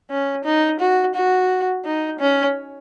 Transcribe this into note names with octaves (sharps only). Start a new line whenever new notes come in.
C#4
D#4
F#4
F#4
D#4
C#4